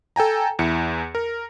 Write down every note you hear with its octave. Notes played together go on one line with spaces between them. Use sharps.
A4 G5 G#5 A#5
E2 E4 C#7
A#4